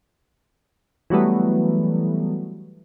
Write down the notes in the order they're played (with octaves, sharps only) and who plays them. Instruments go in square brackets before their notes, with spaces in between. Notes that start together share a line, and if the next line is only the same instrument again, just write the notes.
[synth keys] E3 F#3 G3 A3 B3